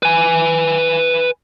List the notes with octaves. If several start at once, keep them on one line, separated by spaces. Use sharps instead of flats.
B4 G#5